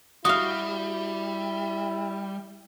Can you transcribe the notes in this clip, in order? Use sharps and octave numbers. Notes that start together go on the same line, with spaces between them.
G3 E4 F#4 F5 D#6